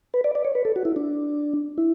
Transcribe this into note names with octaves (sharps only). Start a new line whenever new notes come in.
B4
D5
D5
C#5
B4
A4
F#4
E4
D4
E4